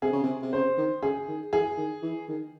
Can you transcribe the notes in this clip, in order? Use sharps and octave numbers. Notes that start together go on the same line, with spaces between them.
C3 G#4
C#3
C3
C3
C#3 C5
D#3
C#3 G#4
D#3
E3 G#4
D#3
E3
D#3